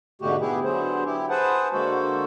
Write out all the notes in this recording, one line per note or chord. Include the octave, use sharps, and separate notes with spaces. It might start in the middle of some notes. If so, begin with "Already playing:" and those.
G#2 B2 D3 A3 F#4 G4
B3 E4 G4 G#4
D3 F#3 B3 G#4 C5
E4 G4
G#4 B4 C5 F#5 A5
D3 G#3 A#3 F#4 A4 C5